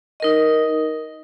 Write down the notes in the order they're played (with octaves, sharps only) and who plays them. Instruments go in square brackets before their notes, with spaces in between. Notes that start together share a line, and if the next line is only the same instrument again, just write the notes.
[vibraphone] D#4 A#4 D#5